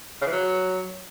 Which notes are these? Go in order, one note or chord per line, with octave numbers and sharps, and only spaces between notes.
C#3
E3
F#3